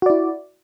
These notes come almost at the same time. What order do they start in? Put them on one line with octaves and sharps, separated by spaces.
F#4 D5 E4